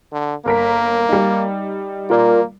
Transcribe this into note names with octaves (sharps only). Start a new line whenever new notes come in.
D3
G1 A#3 A#4 B6
G3 D#4
A#3 F4 A#4 D5